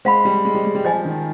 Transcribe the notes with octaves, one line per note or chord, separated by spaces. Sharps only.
G#3 C5 F5 B5
G3
G#3
G3
G#3
G3
F3 C5 D#5 G#5
D#3